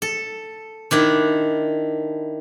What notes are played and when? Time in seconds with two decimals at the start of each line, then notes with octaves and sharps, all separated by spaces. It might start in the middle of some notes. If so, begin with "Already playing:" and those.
0.02 A4
0.91 D#3 D4 E4